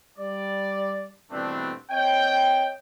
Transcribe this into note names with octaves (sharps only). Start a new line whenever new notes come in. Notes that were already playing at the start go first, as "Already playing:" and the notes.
G3 D5
G2 B2 E3 A3 C4 D4
C4 C#5 D#5 G5